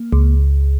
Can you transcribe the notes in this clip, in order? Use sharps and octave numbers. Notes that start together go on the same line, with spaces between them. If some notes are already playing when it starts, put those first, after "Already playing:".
Already playing: A#3
C#2